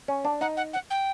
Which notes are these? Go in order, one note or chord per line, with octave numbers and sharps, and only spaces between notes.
C#4
D4
D#4 F#5
F#5
F#5
G5